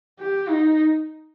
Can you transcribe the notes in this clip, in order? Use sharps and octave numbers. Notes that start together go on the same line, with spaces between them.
G4
D#4